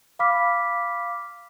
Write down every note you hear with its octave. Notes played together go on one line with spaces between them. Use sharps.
F5 B5 D6 F6 B6